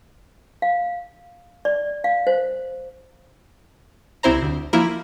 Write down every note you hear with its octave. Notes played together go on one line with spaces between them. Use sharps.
F5
D5
F5
C5
C2 C4 E4 C5 A#5
D2
F3 A#3 E4 A#4